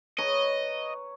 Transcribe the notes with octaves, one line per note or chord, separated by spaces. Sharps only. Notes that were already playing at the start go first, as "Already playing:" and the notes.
B4 C#5 D#5 A#5